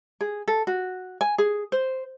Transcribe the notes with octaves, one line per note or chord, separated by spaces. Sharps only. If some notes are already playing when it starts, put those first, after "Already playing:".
G#4
A4
F#4
G#5
G#4
C5